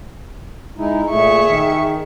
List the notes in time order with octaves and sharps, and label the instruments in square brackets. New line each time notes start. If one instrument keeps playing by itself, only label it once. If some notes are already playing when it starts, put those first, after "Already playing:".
[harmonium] G#3 D#4 E4
[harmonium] A#2 A3 [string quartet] G#4 E5 C#6
[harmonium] D#3